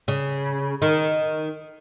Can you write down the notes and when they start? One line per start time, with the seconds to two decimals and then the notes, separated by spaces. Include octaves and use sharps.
0.08 C#3
0.82 D#3